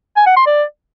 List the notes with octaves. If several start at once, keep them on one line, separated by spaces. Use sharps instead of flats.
G#5
F#5
C6
D5